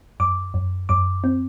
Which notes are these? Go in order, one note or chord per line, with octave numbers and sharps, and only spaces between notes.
F#2 D6
F#2
F#2 D6
C4